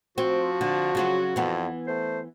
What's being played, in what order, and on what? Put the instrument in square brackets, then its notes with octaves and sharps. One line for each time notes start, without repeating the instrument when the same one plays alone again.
[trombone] F3 [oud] C4 [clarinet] F#4
[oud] D3
C#3 F#3 F4
[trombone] F2 [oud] E3 B3
[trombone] A3 [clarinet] C5